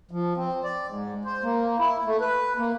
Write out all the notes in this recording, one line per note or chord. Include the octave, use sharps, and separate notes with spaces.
F3
C4
D5
G#2
C5
A#3
E4
A3
B4
A#3